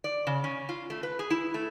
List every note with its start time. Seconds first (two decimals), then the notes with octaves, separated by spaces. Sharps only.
0.04 D5
0.27 C#3
0.44 C#4
0.69 F4
0.90 A3
1.03 B4
1.19 G#4
1.30 E4
1.54 A3